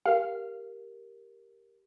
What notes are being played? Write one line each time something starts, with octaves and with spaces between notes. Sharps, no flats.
G4 A#4 F5